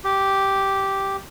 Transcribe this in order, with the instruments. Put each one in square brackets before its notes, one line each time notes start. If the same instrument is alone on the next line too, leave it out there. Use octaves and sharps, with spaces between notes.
[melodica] G4